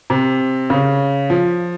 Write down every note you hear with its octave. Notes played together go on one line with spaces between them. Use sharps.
C3
C#3
F3